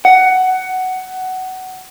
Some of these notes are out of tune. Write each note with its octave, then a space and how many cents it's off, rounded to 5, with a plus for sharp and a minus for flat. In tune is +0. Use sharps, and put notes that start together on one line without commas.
F#5 +15